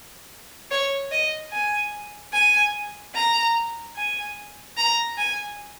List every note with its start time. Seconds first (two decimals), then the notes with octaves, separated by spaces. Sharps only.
0.71 C#5
1.12 D#5
1.52 G#5
2.33 G#5
3.15 A#5
3.96 G#5
4.77 A#5
5.18 G#5